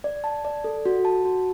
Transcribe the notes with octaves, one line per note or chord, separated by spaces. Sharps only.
D5
A5
D5
A4
F#4
A5
F#4